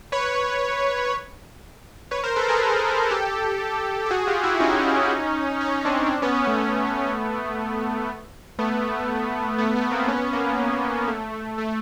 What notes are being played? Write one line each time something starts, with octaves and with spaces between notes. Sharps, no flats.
B4 C#5
B4 C#5
A#4 C5
A4 B4
G#4 A#4
G4 A4
A4
F#4 G#4
F4 G4
E4 F#4
C#4 D#4
C#4 D#4
C4 D4
C4 D4
B3 C#4
A3 B3
A3 B3
A3 B3
A3 B3
A3 B3
A#3 C4
B3 C#4
A#3
A3
A3